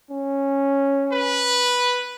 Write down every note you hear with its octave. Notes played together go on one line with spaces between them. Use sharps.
C#4
B4